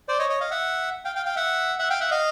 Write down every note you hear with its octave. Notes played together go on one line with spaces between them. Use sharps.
C5 D5
C#5 D#5
C#5 D#5
D#5 F5
E5 F#5
F5 G5
F5 G5
F5 G5
E5 F#5
E5 F#5
F5 G5
E5 F#5
D#5 F5